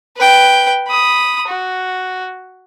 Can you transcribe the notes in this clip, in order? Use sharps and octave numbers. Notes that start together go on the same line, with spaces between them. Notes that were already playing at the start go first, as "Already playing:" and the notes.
B4 G5
B5 D#6
F#4